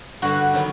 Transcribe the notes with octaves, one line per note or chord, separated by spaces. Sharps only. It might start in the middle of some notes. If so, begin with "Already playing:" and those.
G2 D3 G3 F#4
D#3 F#3 B3 D#4